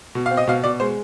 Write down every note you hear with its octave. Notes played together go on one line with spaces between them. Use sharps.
B2
F5
C4
D#5
B2 F5
B2 D5
G#3 C5